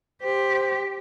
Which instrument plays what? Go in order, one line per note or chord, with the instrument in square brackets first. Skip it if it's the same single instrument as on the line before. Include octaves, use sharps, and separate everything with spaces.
[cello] G4 [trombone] C5